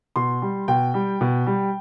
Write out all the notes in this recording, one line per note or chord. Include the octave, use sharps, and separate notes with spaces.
B2 C6
G3
B2 G5
G3
B2
G3